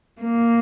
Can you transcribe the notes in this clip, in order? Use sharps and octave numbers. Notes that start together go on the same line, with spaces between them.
A#3